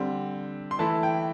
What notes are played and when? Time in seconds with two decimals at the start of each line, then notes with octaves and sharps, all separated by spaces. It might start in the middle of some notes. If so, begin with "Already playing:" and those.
Already playing: D3 G3 C4
0.71 C6
0.79 E3 A3 E4 A5
1.03 G5